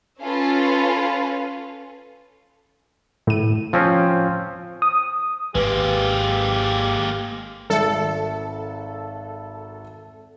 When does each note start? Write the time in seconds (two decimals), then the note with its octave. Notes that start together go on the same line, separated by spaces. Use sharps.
0.21 C#4 F4 A4 B4
3.27 A2 D#7
3.73 F3 C4 C#4
4.82 D#6
5.55 G#1 G#3 A#3 G4 B4 F5
7.70 G#1 A4 E5 C#7